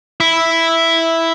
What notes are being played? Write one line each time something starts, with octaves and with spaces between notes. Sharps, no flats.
E4